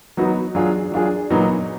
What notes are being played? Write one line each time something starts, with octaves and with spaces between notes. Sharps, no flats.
F#3 B3 D#4 F#4
F#3 D4 F4 G#4
F#3 D4 F4 G#4
A#2 F#3 B3 D#4 F#4